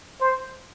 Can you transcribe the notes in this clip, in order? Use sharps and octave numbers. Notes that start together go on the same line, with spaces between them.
C5